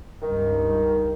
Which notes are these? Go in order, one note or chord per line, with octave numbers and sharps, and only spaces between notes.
C#2 G2 D#3